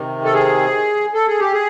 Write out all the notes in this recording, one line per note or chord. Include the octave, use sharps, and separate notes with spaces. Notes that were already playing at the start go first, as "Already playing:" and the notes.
Already playing: C3 D#3
A4
G#4
A4
G#4
G4
G#4